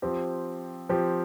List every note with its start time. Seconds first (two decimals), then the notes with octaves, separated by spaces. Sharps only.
0.02 F3 C4 G4
0.89 F3 C4 G4